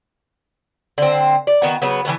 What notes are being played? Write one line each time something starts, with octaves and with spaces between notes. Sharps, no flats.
D3 C4
D5
D#3 B3 F#4
C#3 F#3 B3
E3 G#3 A3 B3